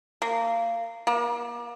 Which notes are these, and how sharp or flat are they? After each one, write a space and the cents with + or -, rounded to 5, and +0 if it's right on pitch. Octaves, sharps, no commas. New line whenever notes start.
A#3 -20
A#3 +35